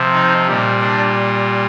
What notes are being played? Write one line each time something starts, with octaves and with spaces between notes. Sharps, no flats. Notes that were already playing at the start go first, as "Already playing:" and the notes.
Already playing: C3 F3
D#4
A#2 G3
D4